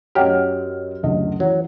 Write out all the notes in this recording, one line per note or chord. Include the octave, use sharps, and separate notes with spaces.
F#2 F#3 G4 D#5 F6
F#1 D2 D#5
E3 F#3